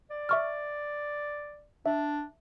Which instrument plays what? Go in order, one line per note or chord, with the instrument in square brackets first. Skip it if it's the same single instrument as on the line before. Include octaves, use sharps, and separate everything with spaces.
[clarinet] D5
[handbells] E5 C#6 F6
[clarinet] D4 [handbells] E5